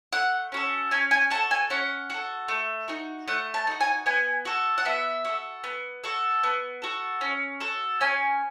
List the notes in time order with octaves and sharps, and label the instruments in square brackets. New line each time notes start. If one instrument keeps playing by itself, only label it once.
[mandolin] A3 F#5
C#4 F#4 A4
C#4 G#5
G#5
F#4 A5
A4
G#5
C#4 F#5
F#4 A4
A3
D#4 F#4
A3 F#5
A5
D#4 F#4
G#5
B3 G#5
F#4 A4
F#5
B3 E5
F#4 A4
B3
F#4 A4
B3
F#4 A4
C#4
F#4 A4
C#4 G#5